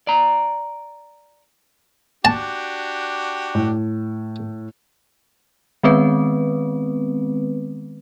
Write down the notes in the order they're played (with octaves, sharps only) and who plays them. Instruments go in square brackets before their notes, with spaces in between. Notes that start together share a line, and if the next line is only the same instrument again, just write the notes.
[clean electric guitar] D5 A#5
[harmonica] D4 F#4 G4 [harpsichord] A5
[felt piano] A2
[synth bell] D#3 G#3 B3 C4 B4